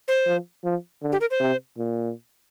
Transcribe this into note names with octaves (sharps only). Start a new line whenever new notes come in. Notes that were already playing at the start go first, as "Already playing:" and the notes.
C5
F3
F3
D3
G4
A#4
C5
C3
A#2